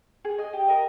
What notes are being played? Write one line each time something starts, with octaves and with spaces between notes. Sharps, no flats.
G#4
D#5 G#5
G4
A#4 D#5